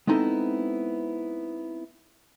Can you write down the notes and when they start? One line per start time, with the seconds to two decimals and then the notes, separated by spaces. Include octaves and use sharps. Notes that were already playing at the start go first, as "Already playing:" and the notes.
0.07 G#3 B3 C4 D#4 E4 A4